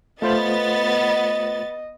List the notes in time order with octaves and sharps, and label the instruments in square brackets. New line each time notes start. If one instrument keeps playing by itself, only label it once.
[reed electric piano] A3 F4 C5 [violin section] B3 A6 [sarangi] D#5